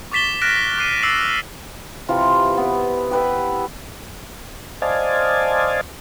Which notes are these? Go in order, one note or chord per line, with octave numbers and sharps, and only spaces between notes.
C#6 D6 A6 B6 E7 G7
F6 F#6 A6 A#6 D7
D6 F#6 C7 D#7
D6 E6 A6 C7 F#7
C3 E3 F4
B3 E4
G4 B4 E5
C5 D5 D#5 F5 G#5 A5